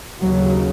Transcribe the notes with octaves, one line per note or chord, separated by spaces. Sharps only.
D#2 C#3 F#3